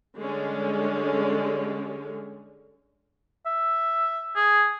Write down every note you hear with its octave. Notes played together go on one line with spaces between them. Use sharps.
D3 G3 G#3 C#4
E5
G#4